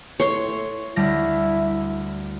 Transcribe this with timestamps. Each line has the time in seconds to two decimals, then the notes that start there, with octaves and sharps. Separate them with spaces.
0.20 A2 C#5 C6
0.96 D2 G3 E4 A#6